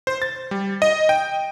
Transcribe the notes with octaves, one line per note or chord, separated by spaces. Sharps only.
C5
A6
G3
D#5
G5